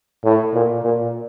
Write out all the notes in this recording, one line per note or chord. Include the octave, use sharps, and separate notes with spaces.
A2
A#2
A#2